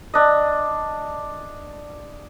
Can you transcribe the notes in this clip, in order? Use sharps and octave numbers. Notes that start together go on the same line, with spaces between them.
D4 D#5